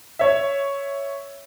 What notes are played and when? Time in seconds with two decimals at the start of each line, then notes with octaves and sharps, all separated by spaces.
0.19 C#5 E5